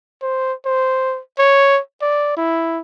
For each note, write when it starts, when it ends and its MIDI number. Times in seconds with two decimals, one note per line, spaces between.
0.22 0.53 72
0.65 1.20 72
1.38 1.80 73
2.02 2.32 74
2.37 2.80 64